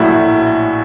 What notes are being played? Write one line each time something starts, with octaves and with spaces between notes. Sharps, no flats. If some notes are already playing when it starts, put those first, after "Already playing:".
Already playing: A#1 A2 F#3 E4 F#4